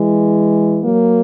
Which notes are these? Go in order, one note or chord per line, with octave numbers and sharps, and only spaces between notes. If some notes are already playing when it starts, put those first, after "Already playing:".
Already playing: E3 G#3
F#3 A#3